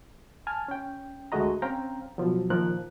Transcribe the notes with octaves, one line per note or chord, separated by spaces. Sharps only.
G#5 A5 F6
C#4 G5
D2 G#3 A3 F#4 D#5 A#5
C4 C#4 F5 G5 A#5
B2 F3 F#3
A#2 D#3 F3 A#4 F#6